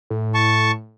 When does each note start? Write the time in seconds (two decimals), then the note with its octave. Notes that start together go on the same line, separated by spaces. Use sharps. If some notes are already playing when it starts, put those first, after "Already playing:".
0.10 A2
0.34 A5 C#6